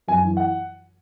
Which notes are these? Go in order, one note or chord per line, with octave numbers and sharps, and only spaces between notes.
F#2 G#5
E3
F#5